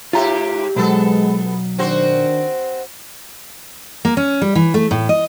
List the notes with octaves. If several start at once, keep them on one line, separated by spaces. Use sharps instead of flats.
G#2 F4 G4 A#5
B1 F#3 G#3 B3 A4
D#3 C4 D4 F#4 C5
A#3
C#4
G3
E3
A3
A2
D#5